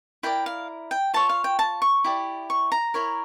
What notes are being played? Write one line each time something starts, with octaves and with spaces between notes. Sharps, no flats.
E4 A#4 D5 G5
F5
G5
F4 C#5 A5
F5
G5
A5
C#6
E4 G4 D5
C#6
A#5
E4 A#4 C#5